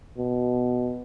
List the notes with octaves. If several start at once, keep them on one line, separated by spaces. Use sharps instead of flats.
B2